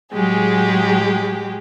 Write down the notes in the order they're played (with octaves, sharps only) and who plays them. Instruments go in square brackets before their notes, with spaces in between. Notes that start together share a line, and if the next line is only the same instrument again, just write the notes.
[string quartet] A2 F#3 G#3 G4 G#4